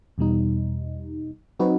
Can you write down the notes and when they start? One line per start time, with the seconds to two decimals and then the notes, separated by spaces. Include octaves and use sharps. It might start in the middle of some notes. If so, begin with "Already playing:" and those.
0.18 E2 B2 G3 D#4
1.59 F#3 C4 D#4 F#4 B4